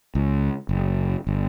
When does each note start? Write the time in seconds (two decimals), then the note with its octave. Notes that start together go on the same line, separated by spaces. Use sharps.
0.15 C#2
0.69 F#1
1.27 G1